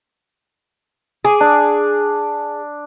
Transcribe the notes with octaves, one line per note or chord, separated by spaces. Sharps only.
G#4 D6
D4